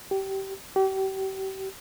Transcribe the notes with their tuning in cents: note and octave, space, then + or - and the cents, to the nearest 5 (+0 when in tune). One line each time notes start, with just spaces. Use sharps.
G4 -20
G4 -35